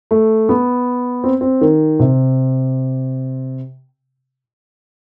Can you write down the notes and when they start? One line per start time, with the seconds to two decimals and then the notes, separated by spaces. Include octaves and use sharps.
0.11 A3
0.49 B3
1.24 C4
1.41 C4
1.61 D#3
1.99 C3